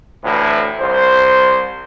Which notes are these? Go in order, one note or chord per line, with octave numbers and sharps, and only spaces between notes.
D2 A2 E3
C2 C5